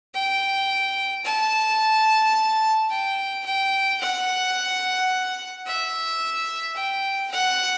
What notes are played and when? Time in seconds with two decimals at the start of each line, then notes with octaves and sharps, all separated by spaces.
0.14 G5
1.24 A5
2.90 G5
3.46 G5
4.00 F#5
5.66 E5
6.76 G5
7.31 F#5